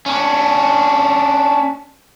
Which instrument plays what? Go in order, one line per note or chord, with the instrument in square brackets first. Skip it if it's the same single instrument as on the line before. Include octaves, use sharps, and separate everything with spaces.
[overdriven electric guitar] C#4 D4